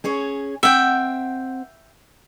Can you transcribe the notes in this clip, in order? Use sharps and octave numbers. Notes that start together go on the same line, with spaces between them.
C#4 G#4 C#5
C4 E5 F#5 G5